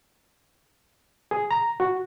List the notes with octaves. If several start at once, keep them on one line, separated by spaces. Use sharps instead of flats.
G#4
A#5
F#4